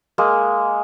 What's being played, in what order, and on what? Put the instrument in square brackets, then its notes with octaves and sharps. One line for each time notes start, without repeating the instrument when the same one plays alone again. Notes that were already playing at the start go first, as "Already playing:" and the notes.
[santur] G#3 A#3